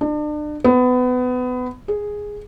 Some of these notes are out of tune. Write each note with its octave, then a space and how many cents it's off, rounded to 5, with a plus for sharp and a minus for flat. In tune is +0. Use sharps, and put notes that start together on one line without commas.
D4 +35
B3 +25
G#4 -5